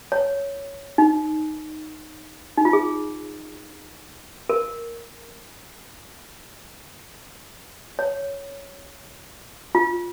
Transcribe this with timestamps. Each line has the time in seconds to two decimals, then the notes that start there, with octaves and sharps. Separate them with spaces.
0.12 C#5
0.98 D#4
2.58 D#4
2.65 F4
2.73 G#4
4.50 A#4
7.99 C#5
9.75 F4